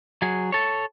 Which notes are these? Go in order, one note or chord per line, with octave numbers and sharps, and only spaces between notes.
F#3 G#4
A4 C#5